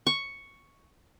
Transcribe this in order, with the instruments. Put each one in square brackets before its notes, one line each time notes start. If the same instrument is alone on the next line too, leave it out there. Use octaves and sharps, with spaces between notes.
[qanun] C#6